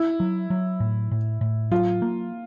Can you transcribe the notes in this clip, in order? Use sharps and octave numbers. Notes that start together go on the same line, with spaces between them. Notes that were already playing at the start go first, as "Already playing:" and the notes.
Already playing: E4
F#3
F#3
A2
A2
A2
F#3 F4
A#3